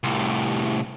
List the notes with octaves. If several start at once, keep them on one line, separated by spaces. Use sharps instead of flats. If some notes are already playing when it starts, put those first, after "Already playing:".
C2 A2